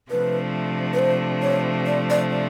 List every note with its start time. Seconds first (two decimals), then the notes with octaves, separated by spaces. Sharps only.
0.11 C3 F3 A3 D4 B4
0.94 B4
0.99 C5
1.42 C#5
1.87 D5
2.10 D5
2.30 D5